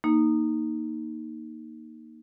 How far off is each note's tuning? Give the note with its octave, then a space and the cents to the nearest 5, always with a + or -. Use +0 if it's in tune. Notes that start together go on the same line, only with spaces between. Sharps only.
A#3 +5 D#4 +0